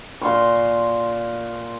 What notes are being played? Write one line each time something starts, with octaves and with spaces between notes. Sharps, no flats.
A#2 C6 C#6